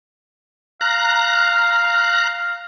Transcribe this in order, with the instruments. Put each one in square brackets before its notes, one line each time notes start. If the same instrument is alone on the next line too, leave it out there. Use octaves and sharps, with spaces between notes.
[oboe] F5 [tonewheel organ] A#5 F#6